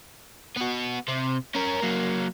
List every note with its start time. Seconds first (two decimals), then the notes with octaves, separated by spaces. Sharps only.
0.56 B3 F#4
1.08 C3
1.55 C#4 A#4
1.82 F#3 A#3